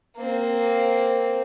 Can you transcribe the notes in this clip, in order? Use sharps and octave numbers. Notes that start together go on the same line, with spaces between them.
A#3 C4